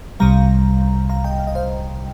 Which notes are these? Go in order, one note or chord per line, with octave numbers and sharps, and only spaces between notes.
C2 C3 G3 F5 A#5
F5 A#5
D#5 G5
F5
D#5
C5 F5